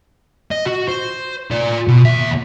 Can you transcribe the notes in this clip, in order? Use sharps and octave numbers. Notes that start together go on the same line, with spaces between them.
D#5
F#4
C5
F4 D5
B2
D#2 E5